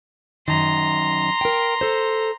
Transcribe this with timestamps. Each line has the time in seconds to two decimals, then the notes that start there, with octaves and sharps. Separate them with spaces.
0.48 F#2 D#3 A#5 C6
1.41 A#4 G5
1.81 A4 C5